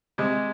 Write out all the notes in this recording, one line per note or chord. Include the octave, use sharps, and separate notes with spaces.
C3 G#3